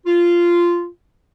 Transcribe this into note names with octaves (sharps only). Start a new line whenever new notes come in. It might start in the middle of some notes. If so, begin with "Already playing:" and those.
F4